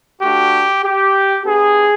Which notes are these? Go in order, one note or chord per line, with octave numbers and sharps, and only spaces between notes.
A3 D4 F#4 G4
G4
B3 D4 G4 G#4